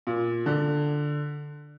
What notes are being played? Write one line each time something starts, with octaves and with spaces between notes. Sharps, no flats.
A#2
D3